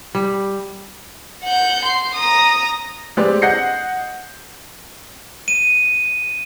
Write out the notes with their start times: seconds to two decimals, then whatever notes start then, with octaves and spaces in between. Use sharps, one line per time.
0.15 G3
1.44 F#5 G6
1.85 C6
2.15 A#5 D#6
3.17 G#3 C4 G4 B4 C5 D5
3.42 D#5 F#5 G6 A#6 C7 C#7
5.48 D#7